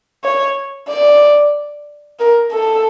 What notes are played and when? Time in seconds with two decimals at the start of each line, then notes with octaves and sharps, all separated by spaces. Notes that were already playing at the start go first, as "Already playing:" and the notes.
0.24 C#5
0.89 D5
2.20 A#4
2.52 A4